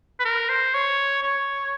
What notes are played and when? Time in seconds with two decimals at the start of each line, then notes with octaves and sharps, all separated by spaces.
0.20 B4
0.25 A#4
0.49 C5
0.74 C#5
1.23 C#5